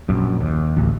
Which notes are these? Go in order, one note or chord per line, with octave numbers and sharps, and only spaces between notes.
A#1 F#2
D#2
A1 D2